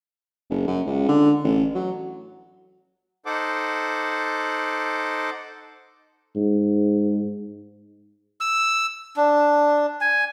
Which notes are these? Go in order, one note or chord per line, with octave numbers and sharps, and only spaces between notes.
F#1
F#2
C#2
D3
A1
F#3
D#4 A4 C5 F#5 D6
G#2
E6
D4
G#5